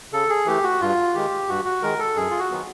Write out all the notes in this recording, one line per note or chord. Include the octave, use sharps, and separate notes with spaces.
C#3 A4
G#4
E3 A3 G4
F#4
G2 F4
D#3 G#3 G4
G2 F#4
F#4
D#3 G#3 A#4
A4
F#2 G#4
F4
F#4
D#3 F#3 B3